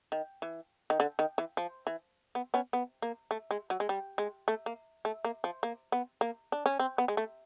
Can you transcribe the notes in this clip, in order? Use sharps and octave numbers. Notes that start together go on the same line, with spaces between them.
D#3
E3
D#3
D3
D#3
E3
F3
E3
B3
B3 C#4
B3
A#3
A3
G#3
F#3
G#3
G3
G#3
A3
A#3
A3
A#3
F3
A#3
B3
A#3
D4
C#4
C4
B3
G#3
A3